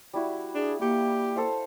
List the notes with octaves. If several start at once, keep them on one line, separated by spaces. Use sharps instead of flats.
G3 E4 F#4
D4 G#4
A#3 G4 C#6
A4 C5 F5